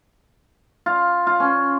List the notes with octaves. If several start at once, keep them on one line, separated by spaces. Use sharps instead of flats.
F4
F4
C#4